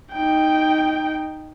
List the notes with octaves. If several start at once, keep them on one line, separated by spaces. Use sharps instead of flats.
D#4 G5